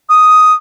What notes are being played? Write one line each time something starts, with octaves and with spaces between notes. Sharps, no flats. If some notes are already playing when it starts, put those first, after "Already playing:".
D#6